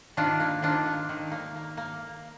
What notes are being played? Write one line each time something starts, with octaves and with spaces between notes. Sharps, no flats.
D#3 D4 F4
A#3
D#3 D4 F4
A#3
D#3
A#3
A#3
A#3